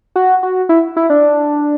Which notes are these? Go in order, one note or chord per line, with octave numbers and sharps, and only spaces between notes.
F#4
F#4
E4
E4
D4